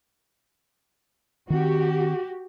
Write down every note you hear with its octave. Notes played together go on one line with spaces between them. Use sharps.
D#3 C4 F#4 G4